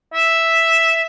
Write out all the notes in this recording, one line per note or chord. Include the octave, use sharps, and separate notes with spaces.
E5